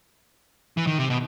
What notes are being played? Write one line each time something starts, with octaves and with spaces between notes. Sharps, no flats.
E3
D#3
C3
B2